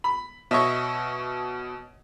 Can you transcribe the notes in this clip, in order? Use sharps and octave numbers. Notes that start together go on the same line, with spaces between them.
B5
B2 C#5 D#5 E5 C#6